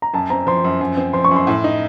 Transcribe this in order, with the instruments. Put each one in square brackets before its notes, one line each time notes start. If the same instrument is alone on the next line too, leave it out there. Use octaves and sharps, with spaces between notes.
[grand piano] A#5
[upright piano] F#2 [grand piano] A5
[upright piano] C4 [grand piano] A#5
[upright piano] F3 [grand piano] C6
[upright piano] F#2
F#2
C4
[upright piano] F3 [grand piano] C6
[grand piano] C#6
[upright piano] F#2
[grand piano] C6
[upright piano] A2
D#4